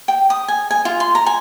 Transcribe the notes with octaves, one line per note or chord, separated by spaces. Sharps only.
G5
D#6
G#5
G#5
F4
C6
A#5
G#5